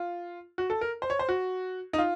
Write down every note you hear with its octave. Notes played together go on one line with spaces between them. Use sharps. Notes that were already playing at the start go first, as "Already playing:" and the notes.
Already playing: F4
F#4
A4
A#4
C5
C#5
C5
F#4
D#4
F4